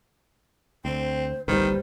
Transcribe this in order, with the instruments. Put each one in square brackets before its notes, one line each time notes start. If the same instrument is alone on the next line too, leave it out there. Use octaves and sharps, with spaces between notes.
[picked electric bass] D2 [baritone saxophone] C4 [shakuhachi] C5
[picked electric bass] G1 C2 [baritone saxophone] D#3 [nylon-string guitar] G3 B4 [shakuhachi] C5